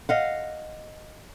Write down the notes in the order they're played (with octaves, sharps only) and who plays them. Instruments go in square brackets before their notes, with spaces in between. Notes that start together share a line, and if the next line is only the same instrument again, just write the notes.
[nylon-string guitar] D#5 F5 F#5